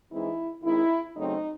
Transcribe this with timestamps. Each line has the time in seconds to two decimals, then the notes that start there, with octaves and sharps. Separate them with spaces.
0.11 E3 G#3 C4 D#4 E4
0.63 D#3 G#3 C4 D#4 E4
1.16 C#3 F#3 A3 C4 D#4